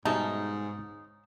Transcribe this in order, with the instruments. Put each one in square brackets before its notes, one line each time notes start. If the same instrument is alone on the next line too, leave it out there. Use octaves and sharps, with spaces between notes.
[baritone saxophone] G#2 [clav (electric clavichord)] B2 G3 G#3 [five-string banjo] C#4 E5 A5 [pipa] D#4